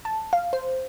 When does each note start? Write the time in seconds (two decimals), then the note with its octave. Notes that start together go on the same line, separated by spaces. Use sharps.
0.05 A5
0.33 F5
0.53 C5